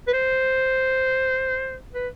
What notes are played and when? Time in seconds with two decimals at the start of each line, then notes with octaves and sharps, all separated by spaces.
0.08 B4
0.13 C5
1.94 B4